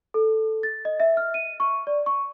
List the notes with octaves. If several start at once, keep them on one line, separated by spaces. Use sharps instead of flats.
A4
A6
D#5
E5
F6
D#7
C#6
D5
C#6